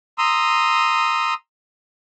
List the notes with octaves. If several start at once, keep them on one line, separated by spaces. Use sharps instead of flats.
A#5 C6 D#6 E6